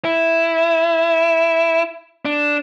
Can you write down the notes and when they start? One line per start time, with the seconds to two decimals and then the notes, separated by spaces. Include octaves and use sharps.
0.05 E4
2.25 D4